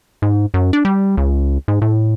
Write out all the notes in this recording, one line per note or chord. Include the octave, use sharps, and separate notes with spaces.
G#2
F#2
D4
G3
C#2
G#2
A2